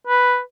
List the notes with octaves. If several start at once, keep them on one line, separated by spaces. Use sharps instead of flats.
B4